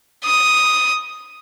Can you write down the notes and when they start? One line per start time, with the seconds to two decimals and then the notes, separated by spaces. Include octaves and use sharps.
0.25 D#6